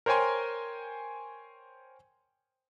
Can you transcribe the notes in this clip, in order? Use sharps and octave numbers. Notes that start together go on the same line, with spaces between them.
A#4 C5 C#5 G5 G#5 C6